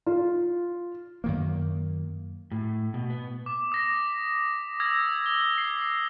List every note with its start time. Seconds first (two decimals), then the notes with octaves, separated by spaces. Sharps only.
0.06 F4
1.24 F#2 D#3 A#3
2.52 A2
2.94 B2
3.10 B3
3.46 D6
3.72 D#6 A#6 B6
4.80 D#6 E6 G#6 A#6
5.26 G7
5.58 C7